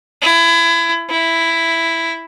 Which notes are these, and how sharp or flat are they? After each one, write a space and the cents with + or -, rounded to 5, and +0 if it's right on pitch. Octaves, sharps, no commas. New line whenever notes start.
E4 +25
E4 +5